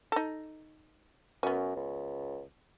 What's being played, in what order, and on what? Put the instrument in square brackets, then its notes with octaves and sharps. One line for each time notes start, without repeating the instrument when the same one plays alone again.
[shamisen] D#4 A4
[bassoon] F#2 [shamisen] B3 C#4
[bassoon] C#2